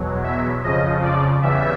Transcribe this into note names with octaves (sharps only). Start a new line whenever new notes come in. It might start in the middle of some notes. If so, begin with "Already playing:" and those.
Already playing: E2 B2 F#3
E5
F2 C#3 F3 D#5
D5
E2 C#3 E3 G3 E5